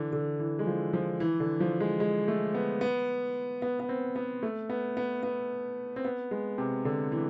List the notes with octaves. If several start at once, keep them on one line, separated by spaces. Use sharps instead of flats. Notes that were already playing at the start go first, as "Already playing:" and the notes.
Already playing: D3 E3
D3
E3
G#3
F3
F3
E3
D3
F3
G#3
G#3
A3
B3
B3
B3
B3
C4
B3
A3
B3
B3
B3
C4
B3
G#3
C3
D3
E3